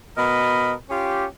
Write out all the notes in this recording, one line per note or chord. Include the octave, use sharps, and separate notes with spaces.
B2 A#4 D#5 B5
C#4 F4 G4